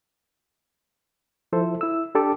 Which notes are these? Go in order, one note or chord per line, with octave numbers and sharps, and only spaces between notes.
F3 E4 A4 C5 E5
E4 E6
D4 G4 A4 A5 D6